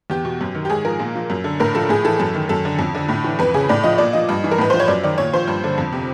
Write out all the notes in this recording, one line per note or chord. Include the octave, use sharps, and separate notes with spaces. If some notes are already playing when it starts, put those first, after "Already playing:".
E2 G4
B2
F#2
D#3
G4
G#2 G#4
F3 A#4
A#2
F3
F#2
D3
A2 A#4
F3 A4
A2 G#4
E3 A4
F#2 A4
D#3
F#2 A4
D3
F2
D3
A2
E3
F2 B4
C#3 G#4
A2 D5
F3 D#5
A#2 D5
F3 D#5
G2
E3
A#4
A2 B4
F3 C5
C#5
F#2 D5
D#3 D5
A#2 C#5
F3 C5
G2
D3
F2
C3